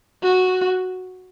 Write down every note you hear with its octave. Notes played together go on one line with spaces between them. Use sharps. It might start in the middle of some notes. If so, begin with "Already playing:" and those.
F#4